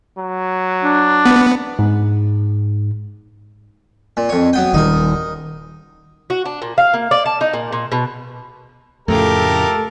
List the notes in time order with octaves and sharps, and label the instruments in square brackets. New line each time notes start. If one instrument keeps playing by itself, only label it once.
[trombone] F#3
[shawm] D4
[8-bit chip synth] B3
[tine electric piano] G#2
[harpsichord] A#2
F2 C#5
F#3 B3 G5
[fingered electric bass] D#1 D#3 G3 [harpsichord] D#4 A#4
[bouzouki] F#4
D4
A#2
F5
A#3
D5
A5
D#4
A#2
A#2
B2
[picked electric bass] F2 A2 C#3 [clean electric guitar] A3 F4 [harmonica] G4 A#4 [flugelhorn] A4